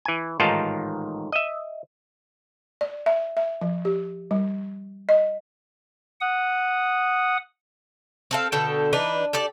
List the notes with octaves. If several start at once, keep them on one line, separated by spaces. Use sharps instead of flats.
E3 G#5
A1 G#2 D#3 D#4 F4 A5
D#5 E5
D5
E5
E5
F3
G4
G3
D#5
F#5 D#6
C4 A4 F5
B2 D3 A4 G5
E3 D4 D#4 B4
G4 A4 D5